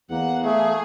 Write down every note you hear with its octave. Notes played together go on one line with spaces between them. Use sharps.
E2 A#3 F#5
A3 G#4